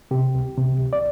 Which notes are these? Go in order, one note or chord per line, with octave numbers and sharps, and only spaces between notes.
C3 G4
C2
C3
C2
D5